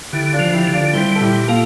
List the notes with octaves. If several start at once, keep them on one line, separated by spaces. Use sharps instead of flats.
D3 E4 G4
D4 F4
F3
E4 G4
D3
D4 F4
G3 C4 E4
A4
A#2 E4 G4
A#3 F4 A4